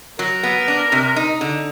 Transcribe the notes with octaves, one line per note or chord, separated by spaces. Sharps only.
F#3 A#4
B3
D4
C3
D#4
D3